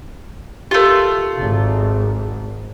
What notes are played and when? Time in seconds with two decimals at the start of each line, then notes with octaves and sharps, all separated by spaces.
0.71 A3 F4 G4 A#4
1.38 G#1 G#2